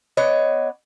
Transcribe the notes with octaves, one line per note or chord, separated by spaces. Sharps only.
B3 D4 C#5 D#5